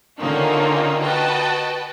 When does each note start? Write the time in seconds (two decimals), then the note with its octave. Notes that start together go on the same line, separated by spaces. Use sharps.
0.20 D3 D#3 A#3 C#4 D#4 F4
1.03 F#4 B4 D#5 G5 A5